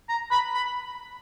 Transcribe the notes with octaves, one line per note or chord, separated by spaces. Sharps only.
A#5
B5
B5